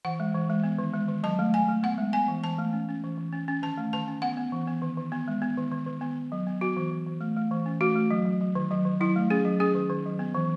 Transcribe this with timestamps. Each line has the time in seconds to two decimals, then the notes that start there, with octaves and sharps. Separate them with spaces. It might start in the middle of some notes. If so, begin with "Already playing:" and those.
0.05 E3 F#5
0.20 G#3
0.35 E3
0.50 G#3
0.64 B3
0.78 D#3
0.94 G#3
1.08 D#3
1.23 F#3 A5
1.39 A3
1.54 A3 G#5
1.69 A3
1.83 B3 F#5
1.98 G#3
2.13 B3 G#5
2.28 E3
2.43 E3 A5
2.58 A3
2.73 C#4
2.89 C#4
3.04 E3
3.18 E3
3.32 C#4
3.48 C#4
3.62 D#3 A5
3.78 A3
3.93 D#3 A5
4.08 C#4
4.22 B3 F#5
4.37 B3
4.52 E3
4.67 B3
4.82 D#3
4.97 D#3
5.12 B3
5.28 G#3
5.42 B3
5.57 D#3
5.72 D#3
5.87 D#3
6.01 B3
6.16 B3
6.32 F#3
6.47 B3
6.61 B3 F#4
6.77 E3
6.91 E3
7.06 E3
7.21 A3
7.36 A3
7.51 E3
7.66 C#4
7.81 A3 F#4
7.96 A3
8.11 F#3
8.25 F#3
8.41 F#3
8.55 D#3
8.71 F#3
8.85 D#3
9.01 F#3 E4
9.16 A3
9.30 C#4 G#4
9.45 F#3
9.60 C#4 G#4
9.75 D#3
9.90 D#3
10.05 F#3
10.19 B3
10.35 E3